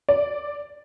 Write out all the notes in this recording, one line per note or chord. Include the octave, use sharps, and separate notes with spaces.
D5